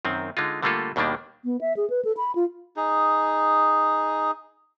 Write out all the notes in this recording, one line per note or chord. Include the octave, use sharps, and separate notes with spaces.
F#2 D#3 C4
D3 G#3 D#4 F4
D3 G3 A3 A#3 F4 A4
D#2 B2 D#3 G3 A#3 D4
B3
E5
G#4
B4
A4
B5
F4
D#4 G#4